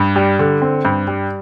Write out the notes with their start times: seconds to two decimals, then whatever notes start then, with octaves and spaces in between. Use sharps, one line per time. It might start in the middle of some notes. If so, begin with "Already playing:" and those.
Already playing: G2
0.16 G3
0.39 D3
0.62 C4
0.85 G2
1.07 G3